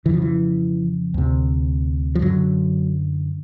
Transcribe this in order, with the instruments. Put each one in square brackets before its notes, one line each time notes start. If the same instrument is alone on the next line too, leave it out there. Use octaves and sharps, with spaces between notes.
[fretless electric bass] F2 C#3 E3
F3
E3
D2 C3
F3
F#2 D3 F#3